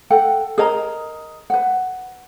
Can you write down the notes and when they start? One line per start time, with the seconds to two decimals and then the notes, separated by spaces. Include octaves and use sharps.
0.10 A4 F#5 G5
0.58 G#4 A#4 D#5 A#5
1.50 B4 F#5